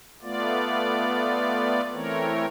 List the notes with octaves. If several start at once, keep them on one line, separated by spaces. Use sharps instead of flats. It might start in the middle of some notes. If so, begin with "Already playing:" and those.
A3 B3 F4 D5
E3 A3 C4 A#4 C#5